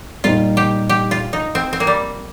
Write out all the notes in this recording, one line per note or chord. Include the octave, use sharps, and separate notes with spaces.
A#2 G3 D#4 F4 C5
G4
G4
F4
D#4
C4
C4
A#3
G3